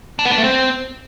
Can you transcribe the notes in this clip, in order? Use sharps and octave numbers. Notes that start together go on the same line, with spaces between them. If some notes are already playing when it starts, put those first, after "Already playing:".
D4
B3
D4
A3
C4